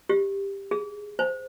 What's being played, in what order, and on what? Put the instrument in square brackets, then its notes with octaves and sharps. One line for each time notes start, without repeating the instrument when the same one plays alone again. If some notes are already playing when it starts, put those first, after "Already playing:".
[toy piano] G4
G#4
C5